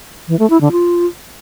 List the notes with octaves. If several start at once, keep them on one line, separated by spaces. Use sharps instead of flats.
E3
A3
E4
D3
F4